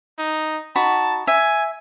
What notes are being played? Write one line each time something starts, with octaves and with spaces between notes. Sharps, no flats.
D#4
D#4 F#4 A5 B5
E5 G#5